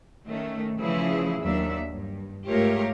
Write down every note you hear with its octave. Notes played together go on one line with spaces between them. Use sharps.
D#3 A3 C#4
C#3 E3 F3 A3 E4 G#4
D#2 F#3 D4 E5
G2
G#2 A3 F4 G4 A#4 C#5